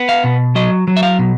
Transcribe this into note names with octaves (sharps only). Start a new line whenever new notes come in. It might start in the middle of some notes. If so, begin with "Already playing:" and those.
Already playing: B3
F5
B2
F#3 D#5
F#3
E5
F5
B2